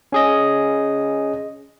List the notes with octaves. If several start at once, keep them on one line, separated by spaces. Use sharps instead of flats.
C#4 G#4 D#5